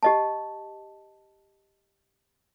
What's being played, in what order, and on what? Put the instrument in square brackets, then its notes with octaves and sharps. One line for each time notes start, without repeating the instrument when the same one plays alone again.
[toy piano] G4 D#5 A5